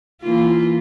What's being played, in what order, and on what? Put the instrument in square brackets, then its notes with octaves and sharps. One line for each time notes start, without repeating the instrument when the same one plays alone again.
[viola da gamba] E3 A#3 F4